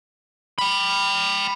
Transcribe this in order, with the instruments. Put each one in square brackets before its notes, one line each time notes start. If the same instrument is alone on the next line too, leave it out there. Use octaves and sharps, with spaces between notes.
[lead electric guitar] G5 B5